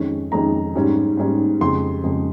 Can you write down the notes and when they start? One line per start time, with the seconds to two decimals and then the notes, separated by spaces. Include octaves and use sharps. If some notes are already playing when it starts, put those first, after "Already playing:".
Already playing: F2 D#3 G#3 C#4
0.32 F2 D#3 G#3 C#4 A#5
0.75 G#2 G3 C#4
1.17 G#2 G3 C#4
1.61 F2 C#3 G#3 C6
2.04 F2 C#3 G#3